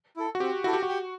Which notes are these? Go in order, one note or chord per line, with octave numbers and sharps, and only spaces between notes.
E4 A4
F#4
C4 G4
E4 F#4 A4
G4
F#4
G4